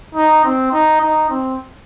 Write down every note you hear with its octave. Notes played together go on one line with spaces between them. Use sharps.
D#4
C4
D#4
D#4
C4